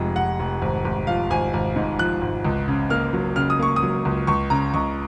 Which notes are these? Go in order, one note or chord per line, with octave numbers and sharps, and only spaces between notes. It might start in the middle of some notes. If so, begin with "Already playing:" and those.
Already playing: F1 F2 G#3
F1 F#5
F1
G#1
G#1
F3 F5
G#1 G#5
G#1
G#2
F3 F#6
G#1
C#2
C#3
A#3 F6
F#3
C#3 F6
D#6
A#3 C#6
D#6
F#3
C#2
C#2 C#6
C#3 A#5
C#2 C#6